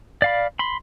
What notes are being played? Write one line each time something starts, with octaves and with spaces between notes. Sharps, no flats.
D5 F5 B5
B5 C6